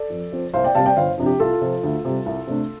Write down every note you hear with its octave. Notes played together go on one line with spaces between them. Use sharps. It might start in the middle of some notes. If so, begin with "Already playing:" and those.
Already playing: A4 D5
F2
F3 C4
C2 C5 F5
D5 G5
C3 G3 C4 F5 A5
D5 G5
G1 C5 F5
F2 C3 F3 D4
G4
C2 F4 A4
C3 F3 C4
D2
C3 G3
C2
C3 A3 D4